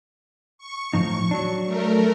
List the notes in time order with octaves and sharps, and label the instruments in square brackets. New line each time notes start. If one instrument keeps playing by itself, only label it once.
[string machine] C#6
[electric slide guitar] A2 F3 D#4 [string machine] C#6
[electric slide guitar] F#3 D4
[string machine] A3 A#4